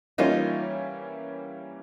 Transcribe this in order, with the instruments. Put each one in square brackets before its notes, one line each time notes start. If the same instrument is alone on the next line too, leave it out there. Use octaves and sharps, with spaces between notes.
[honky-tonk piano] E3 G3 A#3 C#4 [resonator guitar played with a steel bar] D#4 F4